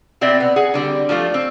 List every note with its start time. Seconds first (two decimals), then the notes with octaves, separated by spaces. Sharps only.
0.21 B2 C4 D5 E5
0.40 B3
0.56 G#4 F#5
0.74 D3 G3 C4
1.09 F3 G3 A3 F4
1.34 C4